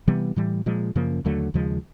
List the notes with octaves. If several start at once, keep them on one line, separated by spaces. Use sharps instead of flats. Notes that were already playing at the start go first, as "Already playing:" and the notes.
C3 E3 G3 B3
A2 E3 G3
A#2 F3 G#3
F#2 C#3 F3 A#3
D#2 D3 F#3 A3
D#2 C#3 F3 G#3